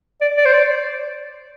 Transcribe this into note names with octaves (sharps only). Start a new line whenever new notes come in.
D5
D5
C5
D5